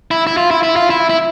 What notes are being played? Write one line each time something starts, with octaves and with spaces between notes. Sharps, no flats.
E4
E4
F4
E4
E4
F4
E4
E4